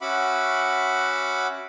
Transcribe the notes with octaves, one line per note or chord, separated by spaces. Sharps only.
C#4 F#4 E5 F#5 B5 D6